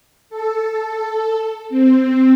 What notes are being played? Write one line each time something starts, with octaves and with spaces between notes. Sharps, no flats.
A4
C4